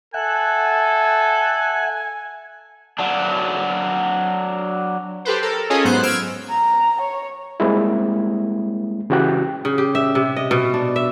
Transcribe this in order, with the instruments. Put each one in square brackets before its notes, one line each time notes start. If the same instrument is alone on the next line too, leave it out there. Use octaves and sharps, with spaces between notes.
[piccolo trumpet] A4 [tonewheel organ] E5 F#5 F#6 [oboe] G#5
[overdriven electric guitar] F#3 D4
[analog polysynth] G4 A4 B4 C5
A4 A#4
C#4 F4 G#4 A4 C#5 D#5
G#2 F#3 B3 C5 F#6
E6 F6 G#6 D7 E7
[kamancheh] A#5
C#5
[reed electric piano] G3 G#3 A#3 C4 E4
C#3 E3 F#4 G4 G5 F#6
[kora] C#3
G4
E5
C3
D#5
B2
D4
E5